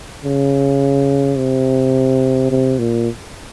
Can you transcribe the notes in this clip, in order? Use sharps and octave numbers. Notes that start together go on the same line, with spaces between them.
C#3
C3
C3
A#2